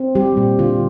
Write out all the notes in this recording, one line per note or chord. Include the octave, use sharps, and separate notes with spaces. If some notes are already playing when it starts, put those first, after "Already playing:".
Already playing: C4
G3 G4
A#2
D3 F4